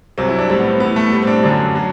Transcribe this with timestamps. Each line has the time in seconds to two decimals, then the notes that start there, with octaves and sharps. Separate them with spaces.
0.18 C2 C3 F#3 C4
0.28 E4
0.38 D4
0.50 A2 G3 C4
0.59 B3
0.70 C4
0.80 A2 E3 G3 B3
0.96 A3
1.12 A2 G3
1.22 C4
1.27 D4
1.43 F#2 D3 F#3 D4
1.75 F#3